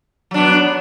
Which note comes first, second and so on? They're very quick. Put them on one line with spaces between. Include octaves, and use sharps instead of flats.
F#3 D4 B3